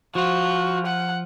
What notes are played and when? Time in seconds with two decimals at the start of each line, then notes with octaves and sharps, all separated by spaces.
0.15 F3 F4 F#4
0.86 F#5